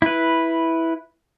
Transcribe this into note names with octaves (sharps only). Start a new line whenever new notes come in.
E4 B4